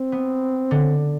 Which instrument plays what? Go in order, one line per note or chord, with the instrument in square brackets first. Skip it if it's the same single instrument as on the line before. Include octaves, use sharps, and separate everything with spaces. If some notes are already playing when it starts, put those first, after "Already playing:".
Already playing: [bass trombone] C4
[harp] B3
D3